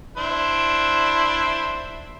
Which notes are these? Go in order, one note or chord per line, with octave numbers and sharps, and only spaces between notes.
D4 E4 C5